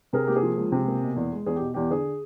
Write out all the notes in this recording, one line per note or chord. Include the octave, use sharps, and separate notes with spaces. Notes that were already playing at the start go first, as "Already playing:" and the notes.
C3 G#4 A#4
A#3 G4
G#4
F3
C#2
C3
A#3
B2
E2
G#3
E2 G#4
B2 G4
E2 G4
D3 G#4